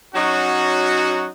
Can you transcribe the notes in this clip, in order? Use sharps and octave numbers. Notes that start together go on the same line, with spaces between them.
F#3 C#4 D#4 F#4